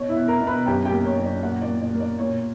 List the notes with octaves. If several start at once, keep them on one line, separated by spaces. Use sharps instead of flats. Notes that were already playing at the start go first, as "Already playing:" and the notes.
Already playing: B2 C#5
E4 E5
B3
A#4 A#5
B2
B4 B5
F#2 G4 G5
G4 G5
A#3
C#5
F#2
D5
A#2 F#4 F#5
D5
A#2
D5
A#3
D5
A#2 C#5